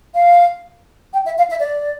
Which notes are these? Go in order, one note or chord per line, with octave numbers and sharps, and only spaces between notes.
F5
G5
E5
F5
E5
D5